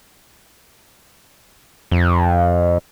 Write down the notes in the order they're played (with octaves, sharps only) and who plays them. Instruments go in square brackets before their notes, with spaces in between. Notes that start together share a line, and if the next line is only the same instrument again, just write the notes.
[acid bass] F2